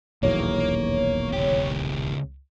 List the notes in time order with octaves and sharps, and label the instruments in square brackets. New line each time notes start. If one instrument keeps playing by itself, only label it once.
[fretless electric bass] D#1 B1 E2 [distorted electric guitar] A#3 [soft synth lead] C#5
[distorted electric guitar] C#2 G4